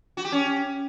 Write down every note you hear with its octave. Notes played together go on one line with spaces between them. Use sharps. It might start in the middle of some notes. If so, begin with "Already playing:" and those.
F#4
G4
C#4